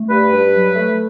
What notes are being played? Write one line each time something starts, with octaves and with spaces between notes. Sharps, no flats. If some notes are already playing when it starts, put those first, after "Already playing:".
Already playing: A3
G2 B4
G2
F#3
A3